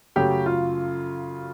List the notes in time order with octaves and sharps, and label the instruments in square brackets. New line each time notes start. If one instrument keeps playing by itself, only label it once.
[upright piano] F#2 C#3 F#3 A3 [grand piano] G4
[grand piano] F4